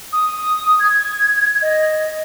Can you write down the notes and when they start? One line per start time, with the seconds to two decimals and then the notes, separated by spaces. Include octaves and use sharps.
0.13 D#6
0.80 G#6
1.62 D#5